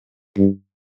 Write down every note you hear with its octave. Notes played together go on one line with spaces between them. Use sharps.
G2